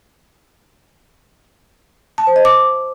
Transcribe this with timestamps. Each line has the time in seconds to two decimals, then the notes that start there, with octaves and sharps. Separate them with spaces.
2.18 A5
2.27 C5
2.36 D#5
2.45 D6